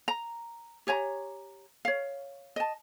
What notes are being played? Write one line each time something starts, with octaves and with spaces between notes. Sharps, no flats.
A#5
G4 C#5 G#5 A#5
C#5 F5
D#5 A5